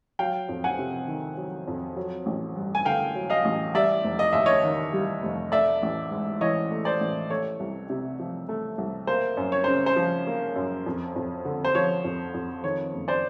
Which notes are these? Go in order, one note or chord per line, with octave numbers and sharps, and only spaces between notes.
F#3 F5 G5
F2
F#5 G#5
C3
D#3
F#3
F2
F#3
A1
G2
G#5
D3 F5 G5
F#3
D#5 F5
A1
G3 D5 E5
F1
D#5
D#2 E5
C#5 D#5
D#3
G3
F1
A3 D5 E5
A1
G#2
E3 C#5 D#5
A3
C5 D5
A1
A3 C#5
C2
C3
F3
A3
C2
A#3 C5
F#2
C#5
C#3 C5
C5
F3
A#3
F#2
F2
F2
D3
C5
F3 C#5
F2
F2
D#3 C#5
F#1
C5 D5